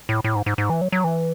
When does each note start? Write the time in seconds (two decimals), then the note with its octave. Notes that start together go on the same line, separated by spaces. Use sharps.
0.09 A2
0.24 A2
0.36 G#2
0.46 G#2
0.58 G#2
0.70 E3
0.81 F#3
0.92 F#3
1.04 E3